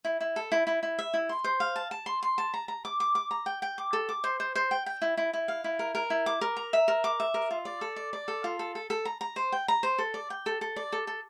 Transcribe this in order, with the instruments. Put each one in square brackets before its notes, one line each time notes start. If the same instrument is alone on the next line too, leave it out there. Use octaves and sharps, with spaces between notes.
[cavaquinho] E4
E4
A4
E4
E4
E4
E5
E4
C6
C5
F5
A5
A5
C6
C6
A5
A#5
A#5
D6
D6
D6
A#5
G5
G5
D6
A4
D6
C5
C5
C5
G5
G5
E4
E4
E4
F5
E4
A#4
A#4
E4
D6
A#4
A#5
E5
A#4
D6
E5
A#4
F4
D5
A4
D5
D5
A4
F4
A4
A4
A4
A#5
A#5
C5
G5
A#5
C5
A4
D5
G5
A4
A4
D5
A4
A4